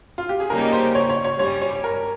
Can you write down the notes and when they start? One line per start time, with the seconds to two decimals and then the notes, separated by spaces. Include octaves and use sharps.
0.18 F4
0.29 G4
0.40 G#4
0.50 C#3 G3 A#3 D#4 G4 A#4
0.72 C5
0.95 C#5
1.09 C#5
1.24 C#5
1.39 G2 G3 C#4 C#5
1.62 C#5
1.84 A#4